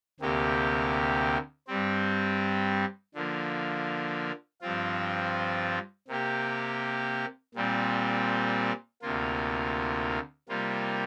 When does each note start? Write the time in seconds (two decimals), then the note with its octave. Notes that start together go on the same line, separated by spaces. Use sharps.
0.20 D2 C3 A#3 G4
1.67 G2 G3 C4
3.14 D3 F3 A#3
4.61 G2 F3 C4 F4
6.08 C3 A#3 G4
7.55 A#2 G3 C4
9.02 D2 C3 A#3 F4
10.49 C3 G3 A#3 F4